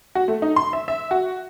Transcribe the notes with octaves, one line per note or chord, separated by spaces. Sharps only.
F#4
A3
D#4
C6
E5
E5
F#4